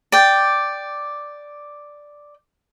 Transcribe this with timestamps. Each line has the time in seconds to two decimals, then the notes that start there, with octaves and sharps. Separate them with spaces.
0.12 D5 G5